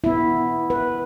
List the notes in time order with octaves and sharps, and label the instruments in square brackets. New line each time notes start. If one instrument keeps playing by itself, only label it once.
[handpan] B3 E4
B4